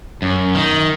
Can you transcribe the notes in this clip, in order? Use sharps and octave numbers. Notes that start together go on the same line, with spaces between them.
F#2
D#3